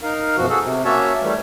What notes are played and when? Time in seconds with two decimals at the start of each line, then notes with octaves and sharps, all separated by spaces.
0.03 D#4 A#4 F5
0.37 F#2 B2 F3 F#4
0.49 F#4 G#4 A4
0.63 C3
0.85 A#3 C#4 F#4 C#5 E5 A5
1.22 E3 G3 A3